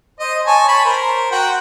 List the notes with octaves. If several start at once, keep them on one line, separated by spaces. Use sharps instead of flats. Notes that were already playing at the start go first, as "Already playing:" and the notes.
C5 D#5
C#5 G#5 A5
A5 B5 C#6
A#4 C5
F#4 F#5 G5